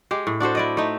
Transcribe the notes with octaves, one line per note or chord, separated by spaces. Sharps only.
G#3 G4
A2
D4 F#4 A4 C5
E4 D5 D#5
A3 D#4